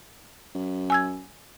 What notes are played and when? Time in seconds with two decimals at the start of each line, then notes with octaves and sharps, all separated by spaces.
0.55 F#2
0.90 G#5 E6 G#6